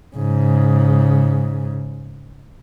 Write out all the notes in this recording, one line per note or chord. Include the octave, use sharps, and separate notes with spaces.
G#2 C#3